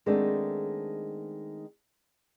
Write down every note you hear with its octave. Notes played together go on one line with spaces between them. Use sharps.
D#3 G#3 A3 B3 C4 D4